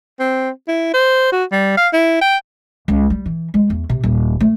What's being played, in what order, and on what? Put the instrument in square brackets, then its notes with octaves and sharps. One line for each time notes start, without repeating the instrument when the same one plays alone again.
[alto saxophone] C4
E4
C5
F#4
G3
F5
E4
G5
[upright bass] C#2
G3
E3
G#3
E2
C3
D#1
A3